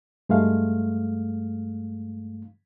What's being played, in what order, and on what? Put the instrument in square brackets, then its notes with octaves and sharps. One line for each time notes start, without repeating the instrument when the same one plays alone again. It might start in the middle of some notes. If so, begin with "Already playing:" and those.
[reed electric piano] G2 G#3 A3 F5